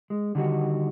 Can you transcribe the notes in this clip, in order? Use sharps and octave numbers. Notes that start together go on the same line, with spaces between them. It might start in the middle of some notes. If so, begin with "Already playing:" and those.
G#3
D3 D#3 G3 D#4 F4 F#4